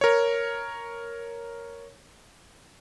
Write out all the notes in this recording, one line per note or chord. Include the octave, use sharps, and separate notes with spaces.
A#4 C#5